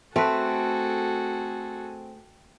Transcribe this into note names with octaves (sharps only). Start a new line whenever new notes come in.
A3 C4 F#4 G#4 A4 B4